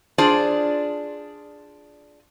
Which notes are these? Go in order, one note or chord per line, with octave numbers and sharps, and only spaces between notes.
D4 F4 G#4 C5 D5